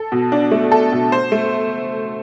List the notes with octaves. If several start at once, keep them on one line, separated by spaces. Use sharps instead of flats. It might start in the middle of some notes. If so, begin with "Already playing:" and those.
Already playing: A4
B2
D4
A3
A4
B2
C5
A3